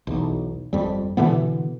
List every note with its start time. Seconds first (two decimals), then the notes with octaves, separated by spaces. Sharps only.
0.07 B1 E2
0.73 G1 F2 G3
1.17 B2 D3 E3 B3